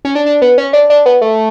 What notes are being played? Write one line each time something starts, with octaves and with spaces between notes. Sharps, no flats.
C#4
D4
D4
B3
C#4
D4
D4
B3
A3